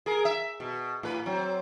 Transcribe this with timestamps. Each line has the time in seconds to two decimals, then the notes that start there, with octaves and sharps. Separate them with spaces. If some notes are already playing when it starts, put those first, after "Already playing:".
0.06 G#4 A#4
0.25 E5
0.60 B2
1.03 A2 B4
1.26 F#3 C4